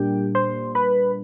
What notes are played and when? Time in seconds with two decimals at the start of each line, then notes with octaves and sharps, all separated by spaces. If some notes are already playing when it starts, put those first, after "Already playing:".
Already playing: A#2 G3 A#3 D4 G4 G5
0.35 C5 C6
0.75 B4 B5